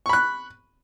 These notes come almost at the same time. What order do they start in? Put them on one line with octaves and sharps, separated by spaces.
C#6 B5 F#6